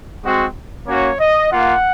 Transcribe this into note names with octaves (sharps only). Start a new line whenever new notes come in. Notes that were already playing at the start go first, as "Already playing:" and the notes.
G#3 C4 F#4
A#3 C#4 F#4 C#5
D#5
A#3 F4 F#5